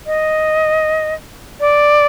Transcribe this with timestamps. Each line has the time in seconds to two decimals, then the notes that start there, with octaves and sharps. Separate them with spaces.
0.06 D#5
1.60 D5